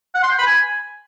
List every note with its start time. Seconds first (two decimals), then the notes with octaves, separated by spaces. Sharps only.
0.15 F#5
0.23 C6
0.31 G5
0.39 B5
0.47 G#5